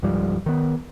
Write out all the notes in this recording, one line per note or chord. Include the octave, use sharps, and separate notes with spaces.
C#2 G#2 F3 G3
D#3 B3